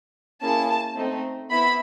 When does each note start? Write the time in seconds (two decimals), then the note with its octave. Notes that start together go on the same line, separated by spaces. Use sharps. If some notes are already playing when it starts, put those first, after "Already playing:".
0.41 A#3 C#4 E4 G#4 A5
0.97 A3 C4 D#4
1.50 B3 E4 B5